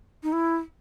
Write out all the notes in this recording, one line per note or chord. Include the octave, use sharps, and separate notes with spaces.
D#4
E4